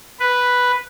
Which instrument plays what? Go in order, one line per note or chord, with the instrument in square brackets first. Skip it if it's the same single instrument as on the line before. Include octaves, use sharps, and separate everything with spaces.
[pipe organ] B4